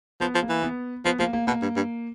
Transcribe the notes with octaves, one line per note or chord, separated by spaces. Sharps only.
F3 B3
F3
A#3
E3
B3
F3 B3
F3 A#3
A#3
B2 A#3
G2
G2